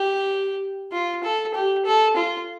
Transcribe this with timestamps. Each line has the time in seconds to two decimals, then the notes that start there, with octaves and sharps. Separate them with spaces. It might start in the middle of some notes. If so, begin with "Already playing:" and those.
Already playing: G4
0.93 F4
1.24 A4
1.55 G4
1.86 A4
2.17 F4